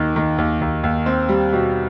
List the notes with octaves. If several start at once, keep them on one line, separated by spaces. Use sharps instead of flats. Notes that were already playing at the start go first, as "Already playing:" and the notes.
Already playing: D#2 D#3
D#3
D#2
D#2
D#2
C4
G3
B2